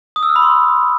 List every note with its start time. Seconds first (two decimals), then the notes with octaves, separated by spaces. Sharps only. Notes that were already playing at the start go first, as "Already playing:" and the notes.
0.16 D#6
0.23 E6
0.29 F6
0.36 B5
0.42 C6